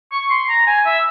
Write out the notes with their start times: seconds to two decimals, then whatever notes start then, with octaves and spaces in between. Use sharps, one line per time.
0.12 C#6
0.30 C6
0.49 A#5
0.67 G#5
0.85 E5